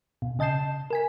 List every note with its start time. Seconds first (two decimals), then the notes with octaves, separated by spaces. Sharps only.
0.22 B2
0.39 C#3 D#5 A5 G6 C7 E7
0.90 A#4 G#5 B6